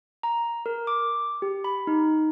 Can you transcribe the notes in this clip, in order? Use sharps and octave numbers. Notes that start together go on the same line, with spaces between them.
A#5
A#4
D6
G4
B5
D#4